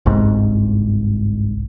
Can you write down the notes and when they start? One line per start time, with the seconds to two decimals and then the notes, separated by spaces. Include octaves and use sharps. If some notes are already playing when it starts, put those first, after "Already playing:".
0.06 G1 C2 G#2